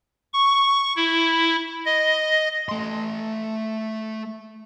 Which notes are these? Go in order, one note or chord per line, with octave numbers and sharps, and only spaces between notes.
C#6
E4
D#5
A3 C6